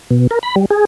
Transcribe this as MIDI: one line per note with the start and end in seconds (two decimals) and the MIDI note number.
0.11 0.27 47
0.31 0.39 70
0.43 0.55 83
0.56 0.66 55
0.71 0.85 68